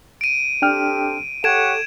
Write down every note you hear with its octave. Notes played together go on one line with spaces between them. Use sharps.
D7 D#7
C4 D4 G4 A4 G5 F6
G4 A4 C#5 F#5 G#6 D7 E7